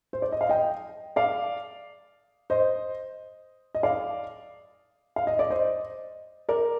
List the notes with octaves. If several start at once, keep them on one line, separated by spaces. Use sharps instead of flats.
C5
D5
D#5
F5
D#5 G5
D5 F5
C5 D#5
D#5
D5 F5
F5
D#5
D5
C5 D#5
A#4 D5